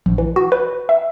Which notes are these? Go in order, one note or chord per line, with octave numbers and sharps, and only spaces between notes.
A#1
E3
F#4
B4
E5